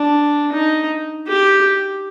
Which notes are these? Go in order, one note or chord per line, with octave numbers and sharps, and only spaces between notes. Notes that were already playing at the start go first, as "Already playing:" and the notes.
Already playing: D4
D#4
G4